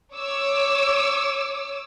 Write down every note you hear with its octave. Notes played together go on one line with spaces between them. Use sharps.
C#5 D6 E6